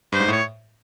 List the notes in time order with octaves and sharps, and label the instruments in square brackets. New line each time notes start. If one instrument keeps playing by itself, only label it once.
[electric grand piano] G2 [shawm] C5
[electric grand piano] G#2
[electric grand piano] A2 [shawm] C#5